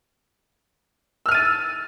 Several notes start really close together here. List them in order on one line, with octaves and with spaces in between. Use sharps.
E6 F6 D#7 A6